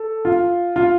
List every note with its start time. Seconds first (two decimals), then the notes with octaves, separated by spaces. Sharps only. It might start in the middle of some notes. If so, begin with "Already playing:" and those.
Already playing: A4
0.25 F4
0.76 F4